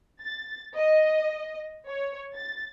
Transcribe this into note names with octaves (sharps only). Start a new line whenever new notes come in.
A6
D#5
C#5
A6